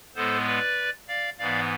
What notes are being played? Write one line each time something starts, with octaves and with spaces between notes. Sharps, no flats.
A2 G#3 B3 A4 C5
B4 D5
D5 F5
G#2 E3 B3 D5 F5